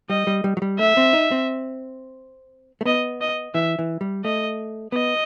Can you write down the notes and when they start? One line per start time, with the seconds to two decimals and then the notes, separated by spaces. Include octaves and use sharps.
0.10 G3 D#5
0.27 G3
0.44 G3
0.57 F#3
0.62 G3
0.79 A3 E5
0.97 C4
1.13 D#4
1.31 C4
2.81 A3
2.85 B3 D#5
3.21 D#5
3.55 E3 E5
3.79 E3
4.01 G3
4.24 A3 D#5
4.92 B3 D#5